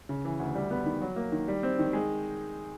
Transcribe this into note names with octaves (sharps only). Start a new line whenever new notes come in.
C#3
E3
D2
G3
B3
D#3
F#3
A#3
D#3
G3
C4
D#3
G#3